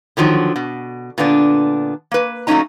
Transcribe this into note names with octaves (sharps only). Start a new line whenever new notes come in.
D3 D#3 F3 F#3
B2
A#2 D3 B3 D4
A#3 B4
F#3 A3 A#3 C#4 D#4 A#5